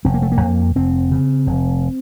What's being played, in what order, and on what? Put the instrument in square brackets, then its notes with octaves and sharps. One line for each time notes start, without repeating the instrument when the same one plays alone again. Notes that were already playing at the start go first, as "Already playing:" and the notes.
[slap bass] F1 C4
A#3
A3
A#3
F2
F1 C4
C#3
F1